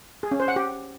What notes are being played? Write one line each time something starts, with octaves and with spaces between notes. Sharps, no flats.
G#4
C#4
C5
F#5
G4